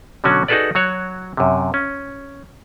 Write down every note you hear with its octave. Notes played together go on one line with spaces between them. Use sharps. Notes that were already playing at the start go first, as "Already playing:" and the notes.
B2 D3 F#3 C#4 F#4
D#4 F#4 G#4 A4 B4 D5
F#3 F#4 C#5
F#2 C3
C#4